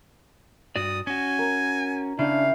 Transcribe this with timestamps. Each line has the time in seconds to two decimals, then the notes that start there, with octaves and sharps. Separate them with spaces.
0.76 G2 F#4 D5 D#6
1.07 C#4 F#4 G#5
1.39 A#4
2.19 C#3 D4 E4 F5 G5